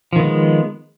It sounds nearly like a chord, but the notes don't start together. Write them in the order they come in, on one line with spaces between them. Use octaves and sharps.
F3 D#3 B3 G#3